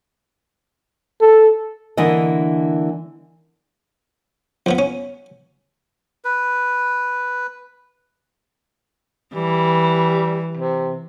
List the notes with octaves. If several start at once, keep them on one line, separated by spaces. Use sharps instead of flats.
A4
D3 E3 A#3 D4 D#5
F2 F3 B3
C#4
B4
E3 G3
C3